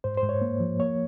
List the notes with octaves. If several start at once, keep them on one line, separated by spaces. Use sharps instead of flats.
G#2 C5
C5
G#2
C#5
A#3
F3
A#3 C#5